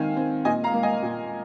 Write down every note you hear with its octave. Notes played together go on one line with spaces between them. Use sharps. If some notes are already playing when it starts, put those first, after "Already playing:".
Already playing: D#3 C4 F5 G#5
C4
A#2 D#5 G#5
F5 A#5
A#3
D#5 G#5
A#2